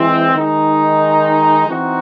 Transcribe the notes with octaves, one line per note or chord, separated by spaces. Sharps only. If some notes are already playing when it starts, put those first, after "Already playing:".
Already playing: E3 G#3 C4
D#3 G#3 D#4
E3 C4 D#4 F#4